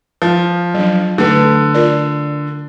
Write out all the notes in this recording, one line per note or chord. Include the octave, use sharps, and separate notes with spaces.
F3
F#3 D4
D3 A3 A4 B4
F4 A#4 D5